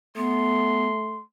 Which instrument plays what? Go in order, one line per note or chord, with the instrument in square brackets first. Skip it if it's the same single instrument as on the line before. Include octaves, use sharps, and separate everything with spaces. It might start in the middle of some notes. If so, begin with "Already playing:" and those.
[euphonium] A3 [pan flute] B3 [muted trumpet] C6